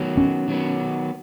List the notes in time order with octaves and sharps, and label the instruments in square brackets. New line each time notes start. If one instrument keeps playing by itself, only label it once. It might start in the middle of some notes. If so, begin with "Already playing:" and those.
Already playing: [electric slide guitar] D#3 F#3 B3
[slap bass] C#4
[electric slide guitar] D#3 F#3 B3